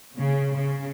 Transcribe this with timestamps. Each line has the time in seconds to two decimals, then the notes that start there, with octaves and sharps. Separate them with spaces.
0.16 C#3
0.53 C#3